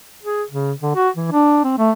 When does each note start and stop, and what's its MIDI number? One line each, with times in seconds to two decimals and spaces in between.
0.23 0.43 68
0.50 0.72 49
0.82 0.94 50
0.95 1.09 66
1.16 1.29 52
1.32 1.61 62
1.64 1.74 60
1.78 1.91 57